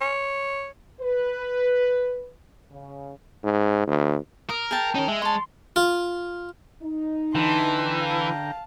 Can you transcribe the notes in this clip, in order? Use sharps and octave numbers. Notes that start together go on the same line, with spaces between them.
C#5
B4
C#3
G#2
D2
A#4 D#6
G#4 G5 A5
C#4 D#4 A#4
G#3 E5
C#5 A5 C6
F4
D#4
D3 E3 G5 A5 A#5 C6
F5 A5